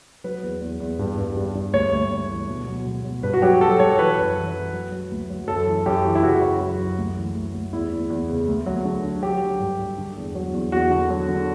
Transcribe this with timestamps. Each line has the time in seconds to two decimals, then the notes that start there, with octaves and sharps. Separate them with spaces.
0.24 F#3 B4
0.43 E2
0.61 E2
0.80 E2
0.99 G2
1.18 G2
1.37 G2
1.55 G2
1.73 D2 C#5
1.93 D2
2.12 D2
2.30 E3
2.49 B2
2.68 F#3
2.86 B2
3.05 F#3
3.23 G2 B4
3.33 F#4
3.42 F#3 G4
3.61 F#3 A4
3.79 F#3 C#5
3.98 E3 B4
4.18 F#2
4.36 E3
4.54 E3
4.73 F#3
4.92 F#3
5.11 D2
5.30 F#3
5.48 F#2 A4
5.67 E3
5.86 F#2 G4
6.05 E3
6.15 E4
6.23 C#3 F#4
6.41 F#2
6.61 F#3
6.79 F#2
6.98 D2
7.17 E3
7.36 D2
7.54 D2
7.73 E2 E4
7.92 E2
8.10 E2
8.29 C#3
8.48 D2
8.66 F#3
8.85 D3
9.04 D3
9.23 F#3 G4
9.41 F#3
9.60 G2
9.79 G2
9.98 D3
10.17 E2
10.35 F#3
10.54 E2
10.72 E2 F#4
10.91 D3
11.10 F#3
11.28 D3